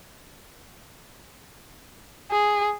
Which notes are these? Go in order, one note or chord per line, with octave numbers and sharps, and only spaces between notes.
G#4